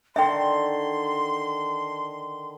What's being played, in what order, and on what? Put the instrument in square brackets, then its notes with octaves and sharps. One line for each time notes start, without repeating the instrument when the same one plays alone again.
[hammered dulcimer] D3 D#3 [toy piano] E5 G5 [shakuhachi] C6